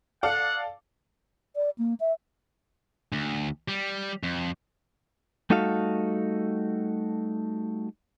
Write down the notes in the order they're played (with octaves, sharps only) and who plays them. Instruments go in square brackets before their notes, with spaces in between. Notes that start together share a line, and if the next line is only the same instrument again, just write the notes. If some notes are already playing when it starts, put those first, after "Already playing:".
[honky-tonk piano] A4 D5 F5 [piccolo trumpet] F#5
[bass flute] D5
A#3
E5
[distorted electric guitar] D2
G3
F2
[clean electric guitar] G3 A3 D#4 F#4 A4 F5